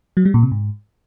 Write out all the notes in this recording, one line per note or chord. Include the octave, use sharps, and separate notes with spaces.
F#3
G3
A#2
C3
G#2